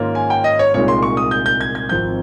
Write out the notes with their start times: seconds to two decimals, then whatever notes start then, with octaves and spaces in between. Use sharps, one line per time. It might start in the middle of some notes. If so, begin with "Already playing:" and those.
Already playing: G#2 D#3 A#3 C#4 F4
0.15 G#5
0.30 G5
0.44 D#5
0.59 C#5
0.74 C2 A#2 G#3 D#4 C#5
0.88 C6
1.02 C#6
1.17 D#6
1.31 G6
1.46 G6
1.61 G#6
1.75 G#6
1.89 G#1 G#2 F3 C4 G6